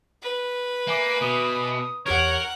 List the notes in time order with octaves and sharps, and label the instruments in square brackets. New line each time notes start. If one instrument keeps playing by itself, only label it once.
[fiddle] B4
[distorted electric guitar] A#3 [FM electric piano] E5 G#5 D6
[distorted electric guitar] B2 [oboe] D#6
[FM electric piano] E2 G4 G#6 [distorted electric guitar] A#4 [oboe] C#5 [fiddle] F#5